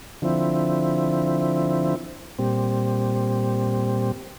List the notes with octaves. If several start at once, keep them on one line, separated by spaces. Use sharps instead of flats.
D3 F3 C4 E4
A#2 G3 C4